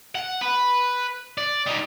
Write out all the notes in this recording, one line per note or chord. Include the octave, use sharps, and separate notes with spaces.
F#5
B4
D5
G3 D#4